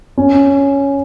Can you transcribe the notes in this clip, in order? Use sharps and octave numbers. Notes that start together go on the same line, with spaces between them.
C#4